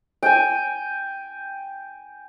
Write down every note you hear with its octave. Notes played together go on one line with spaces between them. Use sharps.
G5 G#5